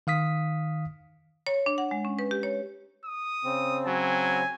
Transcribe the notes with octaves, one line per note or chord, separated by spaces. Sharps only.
D#3 F5 D#6 B6
C#5
D4
F#5
G#3
C#4
B4
G4
C#5
D#6
C#3 C4
F#3 G#5